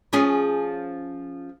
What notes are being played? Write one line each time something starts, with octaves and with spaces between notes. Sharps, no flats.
F3 C#4 G#4